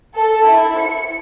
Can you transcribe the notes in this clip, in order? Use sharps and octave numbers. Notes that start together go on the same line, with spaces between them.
A4
E4
C#7